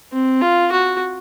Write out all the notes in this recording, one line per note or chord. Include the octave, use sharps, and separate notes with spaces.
C4
F4
F#4